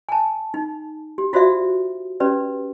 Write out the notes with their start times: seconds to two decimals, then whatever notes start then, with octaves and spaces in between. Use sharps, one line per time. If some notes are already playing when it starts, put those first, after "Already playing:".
0.09 G#5 A5
0.54 D#4
1.18 G4
1.33 F4 F#4 C5 D5 E5 F5
2.20 C#4 G4 B4 D5